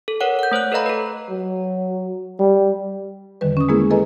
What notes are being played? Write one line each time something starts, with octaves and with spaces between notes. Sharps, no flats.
A4
A#4 B4 C#5 F#5
F#5 G6
A3 C5 C#5 F#6
A4 B4 D#5 F5 A#5 B5
A4 B4
F#3
G3
E2 D3 D#3 G3 B4
C#4 D#6
G#3 A#3 B3 E4 G#4 A#4
G#4 A4 B4 D#5 G#5 A#5